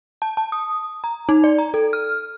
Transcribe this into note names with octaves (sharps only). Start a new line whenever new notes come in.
A5
A5
D#6
A#5
D#4
D5
A#5
A4
F6